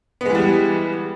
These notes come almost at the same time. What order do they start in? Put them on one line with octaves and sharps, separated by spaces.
B3 G#3 E3 G3